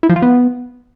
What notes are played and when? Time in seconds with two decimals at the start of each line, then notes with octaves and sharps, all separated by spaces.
0.03 E4
0.09 F3
0.16 F4
0.22 B3